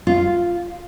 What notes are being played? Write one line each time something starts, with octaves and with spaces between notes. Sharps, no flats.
F4